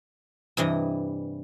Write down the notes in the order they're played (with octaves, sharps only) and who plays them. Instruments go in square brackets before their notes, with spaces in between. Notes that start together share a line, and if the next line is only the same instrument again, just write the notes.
[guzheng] G2 C3 E3 D#5